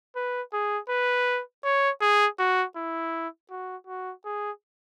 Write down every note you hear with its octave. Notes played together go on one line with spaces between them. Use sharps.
B4
G#4
B4
C#5
G#4
F#4
E4
F#4
F#4
G#4